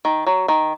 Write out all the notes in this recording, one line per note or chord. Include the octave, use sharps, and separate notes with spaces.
D#3
F#3
D#3